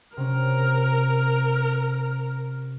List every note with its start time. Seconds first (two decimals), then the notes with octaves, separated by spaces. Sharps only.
0.17 C3 C#4 A#4